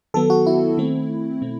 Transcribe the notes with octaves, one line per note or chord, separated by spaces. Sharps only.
D#3 F#3 B3 A4
F#4
E4
D#3 A3 C4
B2 A3 C4